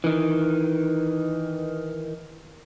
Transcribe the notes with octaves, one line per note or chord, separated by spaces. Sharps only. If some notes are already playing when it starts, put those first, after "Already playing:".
D#3 E3